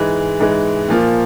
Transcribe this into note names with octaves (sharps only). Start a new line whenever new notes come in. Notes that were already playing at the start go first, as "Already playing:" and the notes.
Already playing: G#2 E3 G#3
G#2 E3 G#3
A#2 F3 A#3 F4